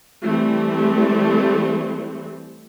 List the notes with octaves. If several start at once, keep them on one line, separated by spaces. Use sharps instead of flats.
E3 G3 A3 C4